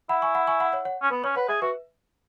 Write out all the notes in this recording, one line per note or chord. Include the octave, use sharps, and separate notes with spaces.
E4 F#5 B5
G#5 C#6
F#5 B5
G#5 C#6
F#5 B5
C#5 F#5
C#5 F#5
C#4
B3 B4
C#4 C#5
B4 C#5 F#5
G#4 E5 G#5
F#4 B4 E5